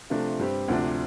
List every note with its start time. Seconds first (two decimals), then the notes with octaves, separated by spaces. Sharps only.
0.10 C3 F3 A3 D4 F4
0.39 G2 G3 C4 G4
0.68 D2 C3 F3 D4